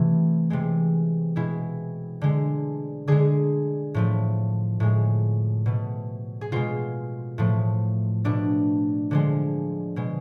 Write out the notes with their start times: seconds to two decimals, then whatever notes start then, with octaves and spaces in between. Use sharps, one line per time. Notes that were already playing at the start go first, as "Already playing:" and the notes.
Already playing: C3 E3 A3 E4
0.50 C3 E3 G#3
1.36 B2 G#3 E4
2.21 D3 G#3
3.08 D3 G#3 G#4
3.94 A2 F3 A3
4.80 A2 G#3
5.66 B2 A3
6.41 G#4
6.52 B2 G#3 F4
7.38 A2 F3 A3
8.24 B2 A3 D4
9.11 D3 F3 G#3
9.96 B2 G#3